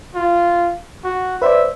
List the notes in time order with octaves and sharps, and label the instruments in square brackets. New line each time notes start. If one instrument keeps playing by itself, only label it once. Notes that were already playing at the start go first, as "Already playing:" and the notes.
[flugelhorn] F4
F#4
[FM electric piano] B4 C5 D5 [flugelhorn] E5